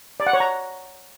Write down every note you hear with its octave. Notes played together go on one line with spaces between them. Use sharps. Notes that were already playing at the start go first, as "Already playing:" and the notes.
D5
F#5
C#5
A#5